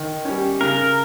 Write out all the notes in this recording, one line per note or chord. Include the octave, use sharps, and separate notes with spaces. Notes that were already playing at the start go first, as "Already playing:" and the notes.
Already playing: D#3
G3 C#4
C#3 A#4